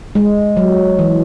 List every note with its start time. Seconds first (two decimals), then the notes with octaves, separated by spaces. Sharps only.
0.15 G#3
0.57 F#3
0.99 E3